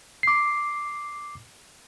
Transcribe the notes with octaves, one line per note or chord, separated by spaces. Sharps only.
D6 C7